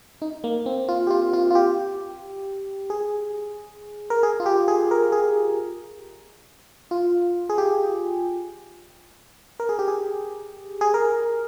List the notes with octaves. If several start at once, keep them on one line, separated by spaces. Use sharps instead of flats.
D#4
A#3
C4
F4
G4
F4
F4
F4
G4
G#4
A#4
G#4
F4
G4
G#4
A#4
G#4
F4
G#4
G4
A#4
G#4
G4
G#4
G#4
A#4